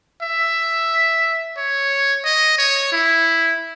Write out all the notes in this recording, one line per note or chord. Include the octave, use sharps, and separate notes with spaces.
E5
C#5
D#5
C#5
E4